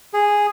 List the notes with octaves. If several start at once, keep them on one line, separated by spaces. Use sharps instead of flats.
G#4